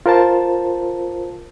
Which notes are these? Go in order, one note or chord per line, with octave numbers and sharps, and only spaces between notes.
F4 A#4 C5 A5